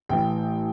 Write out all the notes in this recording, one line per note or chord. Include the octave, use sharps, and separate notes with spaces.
A1 A2 E3 G5